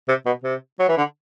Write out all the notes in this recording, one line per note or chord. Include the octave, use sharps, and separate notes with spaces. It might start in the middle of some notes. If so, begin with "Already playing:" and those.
C3
B2
C3
F#3
E3
D3